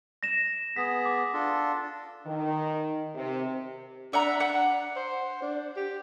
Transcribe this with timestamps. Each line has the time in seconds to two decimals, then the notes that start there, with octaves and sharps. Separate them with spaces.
0.23 A#6 E7
0.76 B3 G#4 B6
1.05 D6
1.33 D4 F4 A4
2.25 D#3
3.15 C3
4.13 D4 E5 F#5 A#5
4.40 F#5
4.96 C5
5.42 D4
5.76 G4